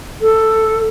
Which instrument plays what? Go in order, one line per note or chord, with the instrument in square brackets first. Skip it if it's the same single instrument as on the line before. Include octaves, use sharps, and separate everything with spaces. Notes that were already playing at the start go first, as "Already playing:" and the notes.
[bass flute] A4